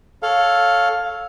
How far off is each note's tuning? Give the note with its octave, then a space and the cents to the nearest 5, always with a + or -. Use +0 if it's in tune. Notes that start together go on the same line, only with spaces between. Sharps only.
A4 +0 C#5 +0 F5 +10